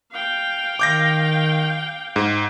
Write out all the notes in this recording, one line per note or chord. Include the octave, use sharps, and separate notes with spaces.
F5 G5
D#3 D6 G6 A#6
G#2